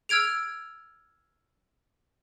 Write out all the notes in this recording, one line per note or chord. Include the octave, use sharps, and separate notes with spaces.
E6 F6 G#6 D7 F7